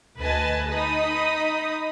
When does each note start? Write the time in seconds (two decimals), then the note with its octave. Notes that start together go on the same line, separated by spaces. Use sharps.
0.17 D2 B4 D#5 G#5 A5
0.69 D#4 D#5 B5 D#6